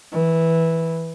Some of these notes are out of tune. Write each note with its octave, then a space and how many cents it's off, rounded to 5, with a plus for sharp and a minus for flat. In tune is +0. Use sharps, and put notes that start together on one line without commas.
E3 -10